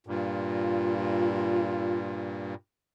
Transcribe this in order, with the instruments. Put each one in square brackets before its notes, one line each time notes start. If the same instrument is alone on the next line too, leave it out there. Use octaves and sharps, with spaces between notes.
[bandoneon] G2 A#2 [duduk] F4